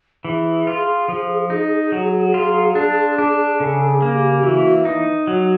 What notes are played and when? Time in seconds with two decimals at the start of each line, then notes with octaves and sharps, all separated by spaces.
0.25 E3 G#4
0.67 F4
1.08 F3
1.50 D#4
1.92 F#3
2.34 F4
2.75 D4
3.18 D4
3.60 C#3 A4
3.88 G#4
4.02 A#3
4.15 G4
4.39 G4
4.43 E3 F#4
4.85 D#4
5.27 F#3 F#4